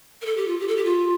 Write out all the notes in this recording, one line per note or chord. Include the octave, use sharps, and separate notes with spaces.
A#4
A4
G4
F4
G4
A4
G4
F4